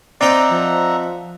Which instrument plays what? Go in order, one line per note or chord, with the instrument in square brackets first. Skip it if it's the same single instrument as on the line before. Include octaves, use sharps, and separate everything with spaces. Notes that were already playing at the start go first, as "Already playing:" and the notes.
[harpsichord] C4 D#4 G5 [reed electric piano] D5 [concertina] E5 F#5 A#5
[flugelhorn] F3